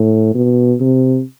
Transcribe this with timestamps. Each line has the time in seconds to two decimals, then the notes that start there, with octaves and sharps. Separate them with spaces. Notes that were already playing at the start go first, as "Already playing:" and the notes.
Already playing: A2
0.35 B2
0.80 C3